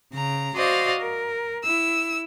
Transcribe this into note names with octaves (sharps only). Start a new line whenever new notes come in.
C#3 A#5
F#4 C5 D5 D#5 F5
A#4
E4 E6